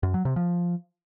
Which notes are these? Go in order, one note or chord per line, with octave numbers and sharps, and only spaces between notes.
F#2
F#3
C3
F3